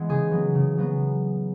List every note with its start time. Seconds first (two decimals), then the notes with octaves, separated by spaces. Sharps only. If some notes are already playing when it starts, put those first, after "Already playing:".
Already playing: E3 G#3 B3
0.09 C#3 G#4
0.31 F#3 B3
0.55 C#3
0.78 F#3 B3